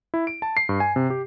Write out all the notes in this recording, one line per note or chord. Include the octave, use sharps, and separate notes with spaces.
E4
D7
A5
C7
G2
G#5
C3
G4